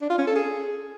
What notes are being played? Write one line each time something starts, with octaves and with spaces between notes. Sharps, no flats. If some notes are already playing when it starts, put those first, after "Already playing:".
D4
F4
C#4
A4
G#4